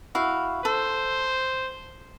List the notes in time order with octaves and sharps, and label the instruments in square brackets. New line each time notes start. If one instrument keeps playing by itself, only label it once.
[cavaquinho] E4 F#4 F5
[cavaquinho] A4 [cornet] C5